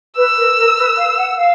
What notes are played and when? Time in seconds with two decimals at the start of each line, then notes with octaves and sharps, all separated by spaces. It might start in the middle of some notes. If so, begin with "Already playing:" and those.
0.17 B4 E6
0.37 A#4
0.57 A#4
0.77 B4
0.96 F5
1.16 F#5
1.36 F5